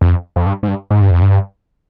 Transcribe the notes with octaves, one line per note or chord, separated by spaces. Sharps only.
F2
F2
G2
G#2
G2
G#2
G2
F2
G2